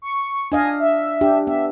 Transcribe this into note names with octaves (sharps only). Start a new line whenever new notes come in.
C#6
D4 D#5 F5 G#5
E5
D4 G4
B3 E5